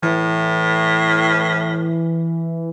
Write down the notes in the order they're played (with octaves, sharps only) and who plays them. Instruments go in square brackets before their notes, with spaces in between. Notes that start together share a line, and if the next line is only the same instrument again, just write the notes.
[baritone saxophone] A2 [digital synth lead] E3